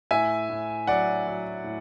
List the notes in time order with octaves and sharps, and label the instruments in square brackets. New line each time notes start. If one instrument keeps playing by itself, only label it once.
[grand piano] A2 E5 G#5
A2
F#3 D5 F#5
F#3
A2